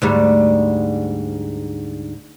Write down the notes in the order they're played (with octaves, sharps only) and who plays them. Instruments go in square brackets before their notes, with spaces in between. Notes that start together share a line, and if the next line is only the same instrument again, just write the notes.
[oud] D2 G#2 G3